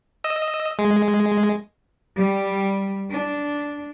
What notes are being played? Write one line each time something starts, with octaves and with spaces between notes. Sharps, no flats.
D#5 E6
G#3
G3
D4